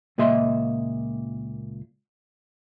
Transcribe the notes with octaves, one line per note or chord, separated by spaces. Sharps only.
C#2 A#2 A#3 D#5 E5 C6